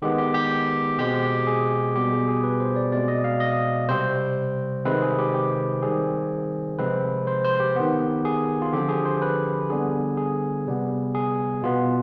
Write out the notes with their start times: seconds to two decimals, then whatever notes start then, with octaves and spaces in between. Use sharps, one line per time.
0.02 D#3 G#3 B3 G4
0.18 G4
0.34 G4
0.98 B2 G#3 C4 G4
1.23 G4
1.47 G#4
1.95 B2 G3 B3 G4
2.12 G#4
2.28 G#4
2.43 B4
2.60 C5
2.76 D5
2.92 B2 G#3 C4 D5
3.08 D#5
3.24 F5
3.40 D#5
3.89 C3 G3 C4 C5
4.85 C3 D#3 G#3 C4 B4
5.02 G#4
5.19 G4
5.34 G4
5.82 D#3 G3 C4 G#4
6.79 C3 F3 G#3 C4 B4
7.27 C5
7.44 C5
7.60 G4
7.76 D#3 B3
8.25 G#4
8.62 F4
8.73 D3 F3 C4 G4
8.89 G#4
9.05 C5
9.22 B4
9.70 D3 G3 B3 G#4
10.17 G#4
10.67 C3 G3 B3
11.15 G#4
11.63 B2 B3 F4